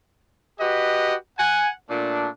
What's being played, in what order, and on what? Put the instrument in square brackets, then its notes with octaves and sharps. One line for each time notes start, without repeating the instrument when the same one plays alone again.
[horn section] F#4 G4 B4 D#5
F#5 G#5
A#2 A3 D4